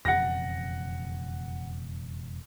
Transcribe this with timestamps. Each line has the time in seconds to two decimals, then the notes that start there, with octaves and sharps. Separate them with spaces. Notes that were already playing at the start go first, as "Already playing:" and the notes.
0.05 E1 F2 C#3 F#5 A#6